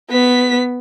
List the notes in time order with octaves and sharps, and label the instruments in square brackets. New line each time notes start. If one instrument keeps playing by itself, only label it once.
[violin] B3 B6